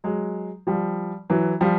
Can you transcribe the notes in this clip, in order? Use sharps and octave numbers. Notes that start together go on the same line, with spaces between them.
F#3 G#3
F3 G3
E3 F#3
F3 G3